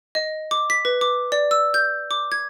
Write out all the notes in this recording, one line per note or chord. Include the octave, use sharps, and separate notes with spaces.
D#5
D6
B6
B4
D6
D5
E6
G6
D6
G#6